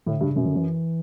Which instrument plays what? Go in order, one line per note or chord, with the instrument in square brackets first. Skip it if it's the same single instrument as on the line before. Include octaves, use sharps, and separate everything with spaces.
[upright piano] A2 [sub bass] D3
[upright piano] G2 [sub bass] C#3
[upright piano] F#2 [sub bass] B2
[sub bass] D3
E3